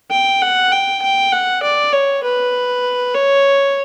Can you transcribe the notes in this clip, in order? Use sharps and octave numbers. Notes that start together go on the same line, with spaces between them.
G5
F#5
G5
G5
F#5
D5
C#5
B4
C#5